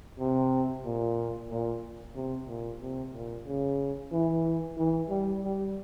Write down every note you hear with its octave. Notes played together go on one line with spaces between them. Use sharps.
C3
A#2
A#2
C3
A#2
C3
A#2
C#3
E3
E3
G3
G3